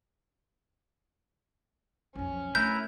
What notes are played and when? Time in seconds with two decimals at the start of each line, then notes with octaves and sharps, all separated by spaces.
2.15 B1 F2 C#4
2.55 A3 D4 E4 A#4 B4 G6